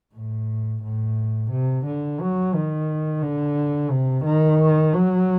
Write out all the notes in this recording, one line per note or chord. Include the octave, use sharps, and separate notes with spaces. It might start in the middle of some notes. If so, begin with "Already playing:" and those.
A2
A2
C3
D3
F#3
D#3
D3
C3
D#3
F#3